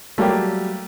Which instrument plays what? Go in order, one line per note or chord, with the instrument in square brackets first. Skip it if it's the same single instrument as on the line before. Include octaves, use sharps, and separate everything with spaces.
[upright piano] F#3 G3 [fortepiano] A3 A#3 G4